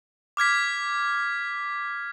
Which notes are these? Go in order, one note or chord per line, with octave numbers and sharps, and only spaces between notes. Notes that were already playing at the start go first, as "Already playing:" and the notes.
D6 F6 G#6 B6